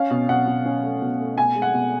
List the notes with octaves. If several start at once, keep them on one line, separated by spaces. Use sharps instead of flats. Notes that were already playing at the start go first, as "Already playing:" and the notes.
Already playing: C#4 F5
B2
B2 F#5
B2
C#4
A3
B2
A3
B2 G#5
G#3
F#5
B2